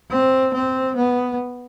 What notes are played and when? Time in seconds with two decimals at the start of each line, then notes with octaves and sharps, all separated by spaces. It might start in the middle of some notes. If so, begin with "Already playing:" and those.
0.10 C4
0.53 C4
0.96 B3